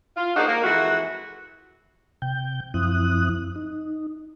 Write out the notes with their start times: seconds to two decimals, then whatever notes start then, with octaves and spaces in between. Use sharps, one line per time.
0.17 F4
0.36 A#3 D4 D#4 F#4 G#4 C5
0.48 A#3
0.64 F2 E3 G#3 F#4
2.22 C3 G5 G6
2.74 F#2 F3 C4 E4 D#6 F#6
3.56 D#4